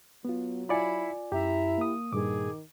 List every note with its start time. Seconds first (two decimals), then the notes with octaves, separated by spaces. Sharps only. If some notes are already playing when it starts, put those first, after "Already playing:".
0.25 F#3 B3 F4
0.69 E4 F4 D5 G#5 B5 C#7
1.32 F#2 E4 G4 E5 A#5
1.78 A#3 D#6
2.13 G2 A#2 D#3 G#4 D6